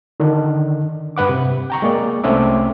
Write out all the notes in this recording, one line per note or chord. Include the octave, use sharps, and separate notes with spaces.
D3 D#3 D4
G2 B4 F#5 D6
C3
G5 A#5 C#6
G#3 A#3 D5
C2 A3 C4 C#4 E5 D6